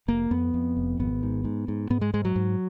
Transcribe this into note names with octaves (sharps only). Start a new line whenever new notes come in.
F1 A#3
F2 B3
F2
F1
G#1 B3
G#2
G#2
G#2
G#2 B3
G#3
G#2 G#3
F#3
G#2